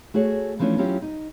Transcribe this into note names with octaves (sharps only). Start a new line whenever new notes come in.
A3 F#4 G#4 C#5
E3 F3 A3 C#4 D4
F#3 C#4 E4 F4 G4
D#4